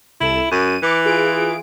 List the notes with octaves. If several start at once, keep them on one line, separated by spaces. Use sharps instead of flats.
C2 E4 A4 E7
F#2 D#7
E3 D6 C#7
F4 G#4 D7